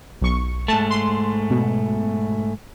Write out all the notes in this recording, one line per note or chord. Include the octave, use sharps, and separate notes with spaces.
B1 C#6
G#2 A3 A5
C6
B2